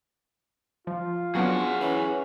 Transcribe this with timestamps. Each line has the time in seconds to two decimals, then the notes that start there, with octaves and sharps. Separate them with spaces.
0.87 F3 F4
1.35 F#3 B3 C#4 D4 G#4 F#5
1.80 E3 C#4